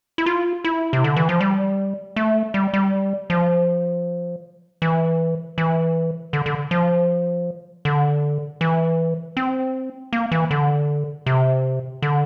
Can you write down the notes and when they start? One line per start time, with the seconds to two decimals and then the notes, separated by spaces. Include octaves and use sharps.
0.18 E4
0.26 F4
0.64 E4
0.93 C3
1.04 D3
1.16 E3
1.29 F3
1.41 G3
2.16 A3
2.54 G3
2.74 G3
3.30 F3
4.82 E3
5.58 E3
6.33 D3
6.46 D3
6.71 F3
7.85 D3
8.61 E3
9.37 C4
10.13 A#3
10.32 E3
10.51 D3
11.26 C3
12.02 D3